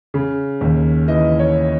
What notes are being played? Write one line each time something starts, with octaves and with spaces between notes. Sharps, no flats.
C#3
D#2
E3 D#5
C#5